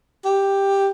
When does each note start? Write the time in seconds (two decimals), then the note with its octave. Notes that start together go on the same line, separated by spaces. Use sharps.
0.25 G4